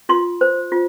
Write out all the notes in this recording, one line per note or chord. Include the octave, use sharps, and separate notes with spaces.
F4 C6
C5
F4